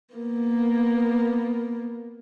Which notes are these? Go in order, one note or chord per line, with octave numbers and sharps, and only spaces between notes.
A#3 B3